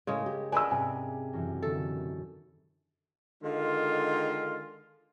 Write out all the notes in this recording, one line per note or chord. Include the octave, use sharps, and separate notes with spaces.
A2 C#3 G#3 C#4 G#4 A#4
G4
D4 G#4 B4 D#5 F#5 G#5 E6
G#2 C3 G#5
F#2 B2 E3
D3 D#3 E4 A4
D3 D#3 G#3 F4